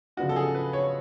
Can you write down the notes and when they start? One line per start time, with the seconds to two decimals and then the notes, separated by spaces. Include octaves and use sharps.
0.17 C#3 F3 B3 D4 F#4
0.29 A4
0.36 G#4
0.55 B4
0.73 C#5